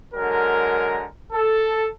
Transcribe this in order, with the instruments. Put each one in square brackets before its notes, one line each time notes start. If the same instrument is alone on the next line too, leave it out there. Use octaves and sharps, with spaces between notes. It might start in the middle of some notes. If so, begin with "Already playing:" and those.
[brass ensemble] D3 F#3 G#3 A#4
A4